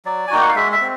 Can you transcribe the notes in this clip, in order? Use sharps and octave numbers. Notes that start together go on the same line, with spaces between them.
F#3 D5
G#5
A#3 D#4 F#4 G5
F#5
F5
G#3 E5
E5
C4